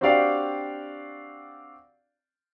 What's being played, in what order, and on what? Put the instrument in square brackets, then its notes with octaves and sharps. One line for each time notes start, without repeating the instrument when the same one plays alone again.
[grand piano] C4 D4 F#4 G4 D5 F5